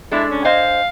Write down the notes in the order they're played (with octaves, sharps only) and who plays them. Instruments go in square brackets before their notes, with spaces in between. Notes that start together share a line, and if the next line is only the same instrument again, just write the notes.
[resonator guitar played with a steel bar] G#3 D4 A4 [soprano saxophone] E4
[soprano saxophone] C#4
[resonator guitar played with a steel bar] C5 D#5 G#5 [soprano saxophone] F5